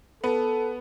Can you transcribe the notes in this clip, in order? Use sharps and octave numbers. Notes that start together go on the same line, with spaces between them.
B3 A4